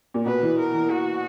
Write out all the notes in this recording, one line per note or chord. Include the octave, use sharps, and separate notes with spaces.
A#2
B2 B4
E3
A#4
E3
F#4